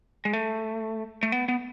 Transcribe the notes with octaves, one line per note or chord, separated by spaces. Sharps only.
G#3
A3
A3
B3
B3